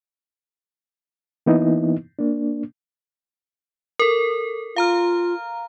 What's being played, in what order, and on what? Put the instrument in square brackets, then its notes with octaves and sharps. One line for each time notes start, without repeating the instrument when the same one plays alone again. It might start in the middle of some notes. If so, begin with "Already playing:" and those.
[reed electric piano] E3 A#3 B3 D#4 E4
A#3 D4
[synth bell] A4 A#4
[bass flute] F4 [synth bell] F5 A#5 F6